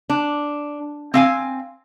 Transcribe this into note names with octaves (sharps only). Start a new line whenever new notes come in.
D4
C4 F5 G#5